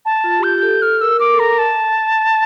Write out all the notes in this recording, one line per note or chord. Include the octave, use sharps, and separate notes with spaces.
A5
F4
G4
F4 G6
G4
A4
A4 F6
A#4 E6
A#4 D6
A4
A#4 A#5
A5